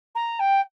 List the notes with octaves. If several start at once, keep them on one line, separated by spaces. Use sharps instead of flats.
A#5
G5